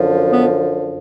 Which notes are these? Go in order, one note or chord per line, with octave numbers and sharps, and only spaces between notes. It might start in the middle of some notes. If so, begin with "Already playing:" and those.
Already playing: F#2 D3 F3
B3